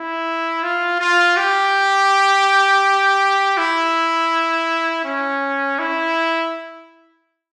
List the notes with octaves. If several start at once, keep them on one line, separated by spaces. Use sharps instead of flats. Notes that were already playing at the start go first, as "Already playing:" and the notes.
Already playing: E4
F4
F4
G4
E4
C#4
E4